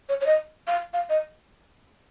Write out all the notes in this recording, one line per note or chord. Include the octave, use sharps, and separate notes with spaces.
C#5
C#5
D#5
F5
F5
D#5